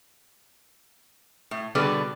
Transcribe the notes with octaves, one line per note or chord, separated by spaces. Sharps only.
A2
B2 D3 G3 G#4 B4 D5